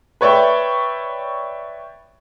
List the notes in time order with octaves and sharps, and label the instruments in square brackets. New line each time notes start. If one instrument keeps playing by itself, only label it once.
[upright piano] B4 C#5 D5 E5 G5